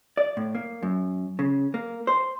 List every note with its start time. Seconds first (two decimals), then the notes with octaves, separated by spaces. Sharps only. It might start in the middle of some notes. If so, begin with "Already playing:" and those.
0.17 D5
0.37 A2
0.55 A#3
0.83 F#2
1.39 C#3
1.74 A#3
2.07 C5